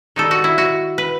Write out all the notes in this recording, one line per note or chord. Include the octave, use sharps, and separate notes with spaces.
D#3 G3 D#4 A4
F#4
E4
F#4
B4